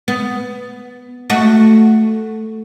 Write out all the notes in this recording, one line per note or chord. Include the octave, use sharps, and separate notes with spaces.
B3
A3 F#4